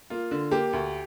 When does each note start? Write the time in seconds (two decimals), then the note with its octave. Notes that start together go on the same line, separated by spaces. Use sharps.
0.10 A#3 F4
0.31 D3
0.51 A#3 G4
0.73 D2